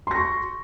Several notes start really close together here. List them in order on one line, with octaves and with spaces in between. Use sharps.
C6 A#6 C#6